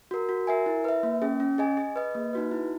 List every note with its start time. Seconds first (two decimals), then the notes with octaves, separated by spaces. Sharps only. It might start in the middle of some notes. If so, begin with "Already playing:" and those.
0.11 F#4 A#4
0.29 F#4
0.47 A#4 E5 G#5
0.66 E4
0.84 B4 E5
1.03 A#3
1.22 C#4 G#4
1.40 C#4
1.58 G#4 D#5 G#5
1.77 G#4
1.96 B4 D#5
2.15 A#3
2.33 D#4 F#4 B4
2.51 E4